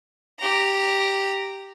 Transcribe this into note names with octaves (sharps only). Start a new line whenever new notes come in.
G4 A#5